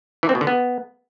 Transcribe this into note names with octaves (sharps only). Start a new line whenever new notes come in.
E3
C4
B2
D3
B3